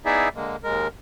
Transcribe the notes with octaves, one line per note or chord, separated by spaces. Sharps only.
B3 D#4 E4 G#4 D5 E5
D3 G#3 A#3
D#2 G#3 A#4